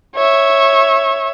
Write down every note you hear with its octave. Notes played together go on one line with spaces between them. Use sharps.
C#5 E5